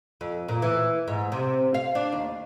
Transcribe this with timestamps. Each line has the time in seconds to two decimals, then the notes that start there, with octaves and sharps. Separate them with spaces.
0.21 F2
0.48 A#2
0.62 E3
1.08 G#2
1.32 C3
1.74 F5
1.95 D4
2.12 D#2